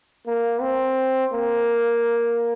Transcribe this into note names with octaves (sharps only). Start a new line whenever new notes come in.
A#3
C4
A#3